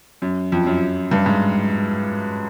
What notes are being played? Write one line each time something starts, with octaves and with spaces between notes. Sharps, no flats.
F#2
F2
F#2
G2
G#2